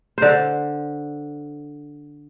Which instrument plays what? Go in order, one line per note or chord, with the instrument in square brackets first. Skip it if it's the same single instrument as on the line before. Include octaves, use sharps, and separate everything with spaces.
[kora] D3 C5